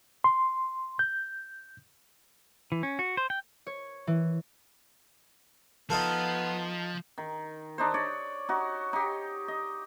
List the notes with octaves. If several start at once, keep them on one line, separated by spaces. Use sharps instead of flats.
C6
G6
E3
C#4
F#4
C5
G5
C#5
E3
F3 B3 D#4 F4 A4
D#3
D4 D#4 C5
C#5 D5
D#4 F#4
D#4 G4
D#5